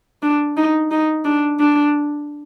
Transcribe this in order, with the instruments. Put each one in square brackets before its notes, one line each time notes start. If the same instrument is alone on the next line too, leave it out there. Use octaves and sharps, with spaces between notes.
[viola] D4
D#4
D#4
D4
D4